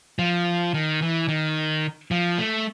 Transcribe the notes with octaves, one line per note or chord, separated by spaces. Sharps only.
F3
D#3
E3
D#3
F3
A3